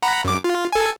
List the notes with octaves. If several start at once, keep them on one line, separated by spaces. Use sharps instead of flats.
F#5 A#5 B5
F#2 D6
F4
A4 G#5